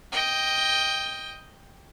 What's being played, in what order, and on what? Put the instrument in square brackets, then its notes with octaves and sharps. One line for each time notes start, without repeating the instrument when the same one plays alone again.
[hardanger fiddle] D#5 G5